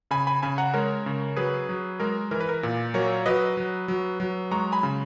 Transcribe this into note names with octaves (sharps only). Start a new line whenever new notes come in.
C#3 G#5 B5
G#5 B5
C#3 G#5 B5
F#5 A#5
G#3 A#4 C#5
C#3
F#3 G#4 B4
F#3
G#3 A#4
E3 A#4
B4
A#4
A#2
F#3 A#4 C#5
F#3 B4 D#5
F#3
F#3
F#3
G#3 A#5 C#6
G#5 B5
C#3